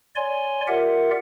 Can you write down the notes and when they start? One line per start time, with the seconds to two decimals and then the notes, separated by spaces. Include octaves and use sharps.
0.16 C#5 D5 G#5 C6
0.68 F4 G4 A#4 D5 E5 F#5